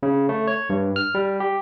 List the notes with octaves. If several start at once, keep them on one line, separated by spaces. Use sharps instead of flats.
C#3
A3
C#5
G2
F6
G3
G4